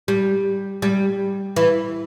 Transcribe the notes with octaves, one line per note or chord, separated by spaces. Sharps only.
G3
G3
E3